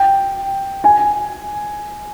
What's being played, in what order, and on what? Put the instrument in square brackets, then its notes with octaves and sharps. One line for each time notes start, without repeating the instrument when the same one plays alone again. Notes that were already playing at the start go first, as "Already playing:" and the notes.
Already playing: [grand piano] G5
G#5